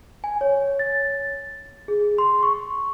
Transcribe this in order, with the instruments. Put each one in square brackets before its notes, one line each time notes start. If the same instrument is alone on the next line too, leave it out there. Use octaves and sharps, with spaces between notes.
[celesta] G#5
C#5
A6
G#4
C6
C#6